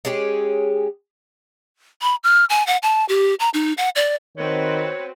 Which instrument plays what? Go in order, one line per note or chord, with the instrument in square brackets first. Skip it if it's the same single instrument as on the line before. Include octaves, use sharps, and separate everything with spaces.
[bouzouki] G#3 C#4 G4 G#4
[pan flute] B5
F6
G#5
F#5
A5
G4
A#5
D#4
F#5
D5
[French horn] D#3 [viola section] C4 F#4 B4 [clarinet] C#5